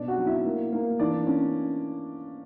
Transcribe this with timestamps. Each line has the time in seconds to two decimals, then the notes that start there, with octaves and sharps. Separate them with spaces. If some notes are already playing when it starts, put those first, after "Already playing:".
Already playing: B2 D4 D5
0.08 F#4 F#5
0.18 F#3
0.26 E4 E5
0.45 A#3
0.72 A#3
0.99 E3 D4 D5
1.27 C#4